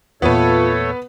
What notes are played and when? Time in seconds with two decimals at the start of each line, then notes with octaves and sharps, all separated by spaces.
0.22 E2 A#2 A3 B3 F4 A4 B4 C#5